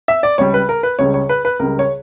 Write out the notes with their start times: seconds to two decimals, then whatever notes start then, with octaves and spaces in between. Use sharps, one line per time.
0.08 E5
0.23 D5
0.38 C#2 C#3 G3 C#5
0.54 B4
0.69 A#4
0.83 B4
0.99 C#2 C#3 G3 C#5
1.14 C#5
1.29 B4
1.45 B4
1.59 C#2 C#3 G3 A#4
1.79 C#5